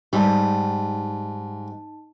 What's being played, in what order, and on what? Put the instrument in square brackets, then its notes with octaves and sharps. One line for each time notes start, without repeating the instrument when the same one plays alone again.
[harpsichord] G#2 [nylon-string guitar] G3 [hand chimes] D#4 A5